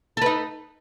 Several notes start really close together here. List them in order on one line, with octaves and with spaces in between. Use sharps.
A4 B4 D#4